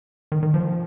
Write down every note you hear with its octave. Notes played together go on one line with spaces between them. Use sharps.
D#3
D#3
F3